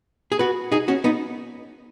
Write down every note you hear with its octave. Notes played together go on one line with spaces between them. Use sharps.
G#4
F#4 B4
D#4 G#4
C#4 F#4
B3 D#4